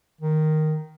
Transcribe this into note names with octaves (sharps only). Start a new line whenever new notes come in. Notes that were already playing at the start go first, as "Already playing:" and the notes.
D#3